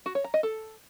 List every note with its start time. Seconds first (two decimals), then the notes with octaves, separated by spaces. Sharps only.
0.06 F#4
0.15 C#5
0.24 A#5
0.34 D#5
0.43 A4